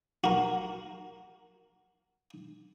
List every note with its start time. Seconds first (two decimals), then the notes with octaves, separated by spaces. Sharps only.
0.24 F#4 A#4